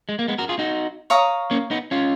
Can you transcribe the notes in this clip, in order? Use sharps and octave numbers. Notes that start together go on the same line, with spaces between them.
G#3
A#3
G#3 B3
F#4 A#4
F4 G#4
D#4 F#4
C#5 F5 A#5 D#6
A#3 C#4
B3 D#4
C#4 F4